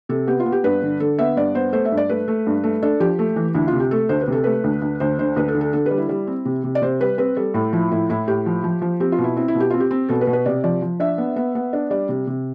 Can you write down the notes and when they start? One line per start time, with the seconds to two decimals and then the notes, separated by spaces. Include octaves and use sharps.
0.09 C3 A4
0.27 B3 G4
0.40 F4
0.46 B3
0.52 G4
0.64 G2 B4
0.82 D3
1.00 D3 A4
1.19 B3 E5
1.37 G2 D5
1.55 B3 C5
1.73 A3 C5
1.85 E5
1.92 G2
1.97 D5
2.10 A3 B4
2.28 A3
2.47 G2
2.64 A3
2.83 D4 A4
3.00 F3 G4
3.19 A3
3.36 E3
3.55 D2 E4
3.68 F4
3.73 C3
3.80 G4
3.91 A3 A4
4.09 D2 C5
4.21 B4
4.27 C3 A4
4.44 A3 B4
4.64 D2
4.82 D2
5.00 D2 C5
5.19 D3 C5
5.36 D2 B4
5.48 A4
5.55 D3
5.61 A4
5.73 D3 A4
5.86 B4
5.91 G3
5.98 E4
6.09 G3
6.27 C4
6.45 C3
6.64 C3
6.75 D5
6.82 C3 C5
7.00 G3 B4
7.18 C4 B4
7.36 G3 A4
7.54 A2 A4
7.73 F3 E4
7.91 A2 E4
8.09 A2 E4
8.27 A2 G4
8.46 F3
8.64 F3
8.82 F3
9.00 C4 G4
9.12 F4
9.18 B2
9.24 E4
9.36 C4 E4
9.48 E4
9.55 B2
9.60 G4
9.70 C4 F4
9.80 G4
9.91 C4
10.09 B2 A4
10.21 B4
10.27 B2
10.33 B4
10.46 C3 D5
10.64 F3 D5
10.82 F3
11.00 D4 E5
11.18 B3
11.36 B3
11.55 B3
11.73 D4
11.90 G3 D5
12.09 C3
12.27 C3